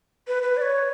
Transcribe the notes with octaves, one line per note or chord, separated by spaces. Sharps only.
B4
B4
D5
C#5